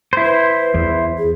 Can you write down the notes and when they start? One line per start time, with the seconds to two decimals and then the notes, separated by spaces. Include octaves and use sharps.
0.13 E4 C5
0.24 B4
0.74 E2
1.18 G#4